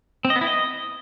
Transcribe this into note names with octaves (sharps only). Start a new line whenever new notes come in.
C4
D#5
B3
E4
D#5